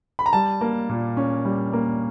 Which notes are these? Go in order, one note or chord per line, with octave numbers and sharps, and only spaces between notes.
B5
A#5
G3 A5
A#3
A#2
C#4
G3
A#3